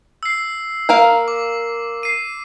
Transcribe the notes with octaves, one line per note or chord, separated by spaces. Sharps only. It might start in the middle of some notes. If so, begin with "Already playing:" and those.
E6 C7
A#3 A#4 F5
D6
C7 D#7